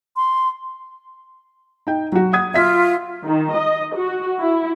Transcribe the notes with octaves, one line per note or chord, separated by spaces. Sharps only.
C6
D#4 G5
F#3 F#4
F#5 D#6 G#6
F4 E5 B6
D#3
D#5
F#4
E4